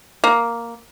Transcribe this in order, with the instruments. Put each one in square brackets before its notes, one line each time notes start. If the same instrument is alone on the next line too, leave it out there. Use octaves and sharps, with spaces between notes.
[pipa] A#3